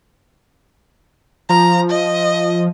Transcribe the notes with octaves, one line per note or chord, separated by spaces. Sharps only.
F3 A#5
D#5